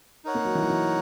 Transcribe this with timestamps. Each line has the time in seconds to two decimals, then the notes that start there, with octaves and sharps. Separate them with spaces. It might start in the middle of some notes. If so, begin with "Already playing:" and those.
0.25 D#4 A#4 C#5 F#5
0.35 A#3
0.45 F#3
0.55 E3
0.63 F#3
0.70 E3